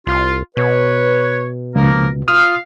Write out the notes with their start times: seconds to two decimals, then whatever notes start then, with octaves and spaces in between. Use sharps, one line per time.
0.07 C2 F4
0.57 B2 B4 C#5
1.76 C#2 F3 A#3 A#4
2.28 F4 F5 D#6 F6